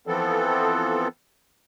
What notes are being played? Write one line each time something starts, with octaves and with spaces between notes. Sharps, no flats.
E3 F3 B3 C4 A4